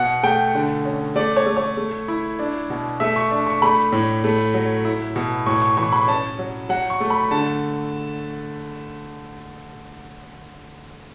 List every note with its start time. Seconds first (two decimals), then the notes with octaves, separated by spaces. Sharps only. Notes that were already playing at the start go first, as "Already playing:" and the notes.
Already playing: B2 F#5
0.23 A3 G5
0.55 D3
0.85 C#4
1.16 A3 D5
1.37 C#5
1.46 A3
1.57 C#5
1.77 A3
2.08 E4
2.39 D4
2.70 B2
3.00 A3 E5
3.16 C#6
3.31 D4
3.46 C#6
3.62 A3 B5
3.92 A2
4.24 A3
4.54 F#3
4.85 E4
5.16 B2
5.46 A2 C#6
5.62 C#6
5.77 E3 C#6
5.92 B5
6.08 C#4 A5
6.39 F#3
6.69 F#3 F#5
6.90 C#6
7.00 A3
7.10 B5
7.31 D3 A5